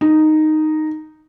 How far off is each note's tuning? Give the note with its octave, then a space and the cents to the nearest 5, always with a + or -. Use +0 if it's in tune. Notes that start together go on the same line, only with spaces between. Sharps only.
D#4 -5